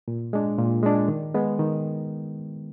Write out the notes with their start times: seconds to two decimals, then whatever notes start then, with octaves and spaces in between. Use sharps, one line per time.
0.08 A#2
0.33 G#3 D4
0.59 A#2
0.83 G#3 D4
1.08 D#3
1.34 G#3 B3
1.59 D#3